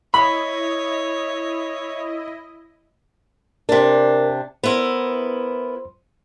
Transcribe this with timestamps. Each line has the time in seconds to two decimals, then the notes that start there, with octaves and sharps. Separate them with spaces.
0.14 E4 C#5 D#5 B5
3.69 C3 D4 A#4
4.64 B3 E4 A#4 C5 C6